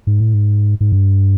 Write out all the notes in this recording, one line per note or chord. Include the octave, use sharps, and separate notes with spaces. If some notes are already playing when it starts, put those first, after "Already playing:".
G#2
A2
G#2
G#2
G2